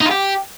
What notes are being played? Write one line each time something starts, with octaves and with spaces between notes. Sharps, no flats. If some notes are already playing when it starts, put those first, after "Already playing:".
D#4
F4
G4